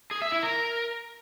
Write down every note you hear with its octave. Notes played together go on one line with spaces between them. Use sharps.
G#4
E5
E4
A#4